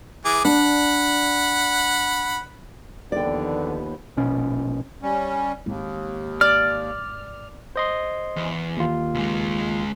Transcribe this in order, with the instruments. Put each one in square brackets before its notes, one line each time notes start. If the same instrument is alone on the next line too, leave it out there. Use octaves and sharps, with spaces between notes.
[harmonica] E3 G#4 D6
[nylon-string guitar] D4 [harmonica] F#5 B5
[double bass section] D#2 F3 B3 [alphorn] D3 [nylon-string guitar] D5 G5
[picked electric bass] A#1 B2 C#4
[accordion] G3 C#4
[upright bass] G#1 [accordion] D#2
[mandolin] D5 [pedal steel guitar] F6
[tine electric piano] C5 D#5 C6
[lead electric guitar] E2
[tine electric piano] D#2 F4
[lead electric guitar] C#2 G#3